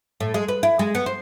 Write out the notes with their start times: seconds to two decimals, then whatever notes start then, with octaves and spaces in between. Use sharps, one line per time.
0.20 A2
0.34 G#3
0.48 B4
0.63 E4
0.79 G#3
0.95 B3
1.06 C5